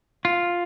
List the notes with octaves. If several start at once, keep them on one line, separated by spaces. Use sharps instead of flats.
F4